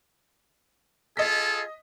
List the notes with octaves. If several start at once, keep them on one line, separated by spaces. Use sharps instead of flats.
F4 G#4 A4 D#5 B6